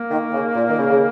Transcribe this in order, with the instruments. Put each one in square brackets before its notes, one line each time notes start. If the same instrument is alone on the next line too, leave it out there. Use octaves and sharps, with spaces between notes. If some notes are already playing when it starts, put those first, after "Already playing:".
Already playing: [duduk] A#3
[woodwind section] D#3
C#3
A#2
D#3
C#3
C#3